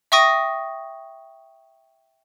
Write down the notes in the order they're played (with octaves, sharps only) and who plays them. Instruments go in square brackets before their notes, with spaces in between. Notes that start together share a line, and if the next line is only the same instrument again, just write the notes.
[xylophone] E5 G5 C#6 D#6 A#6 D#7